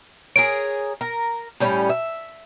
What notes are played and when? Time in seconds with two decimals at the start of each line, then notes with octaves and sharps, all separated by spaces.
0.36 G#4 A#4 C#5 D7
1.01 A#4
1.60 A2 G3 C#4
1.90 E5